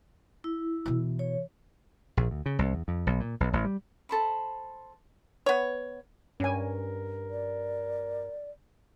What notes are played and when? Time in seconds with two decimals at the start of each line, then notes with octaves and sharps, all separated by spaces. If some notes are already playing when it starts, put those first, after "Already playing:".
0.44 E4
0.86 B2 E3
1.19 C#5
2.17 A#1
2.31 D2
2.46 C#3
2.59 C2
2.74 E2
2.88 F2
3.07 B1
3.20 A#2
3.40 B1
3.53 A1
3.65 G3
4.09 A4 C5 B5
5.46 B3 C#5
6.40 G2 C#4 A#4 G#5
7.31 D5